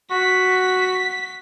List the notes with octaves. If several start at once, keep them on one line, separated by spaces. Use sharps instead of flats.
F#4 B6